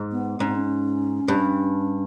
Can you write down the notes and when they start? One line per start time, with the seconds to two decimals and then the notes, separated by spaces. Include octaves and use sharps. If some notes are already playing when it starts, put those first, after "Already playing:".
Already playing: G#2
0.12 B3
0.40 G#2 C#4
0.48 C4
0.55 C#4
1.28 G2